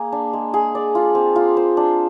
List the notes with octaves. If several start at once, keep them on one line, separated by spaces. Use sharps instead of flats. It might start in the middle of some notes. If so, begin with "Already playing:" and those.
Already playing: A#3 G#4
D4
G#3
G#4
D5
F4
C4
F4
C5
D4